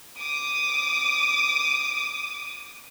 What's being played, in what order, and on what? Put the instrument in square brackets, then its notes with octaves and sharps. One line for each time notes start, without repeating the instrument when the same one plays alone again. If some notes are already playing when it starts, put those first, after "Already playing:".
[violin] D6 D#6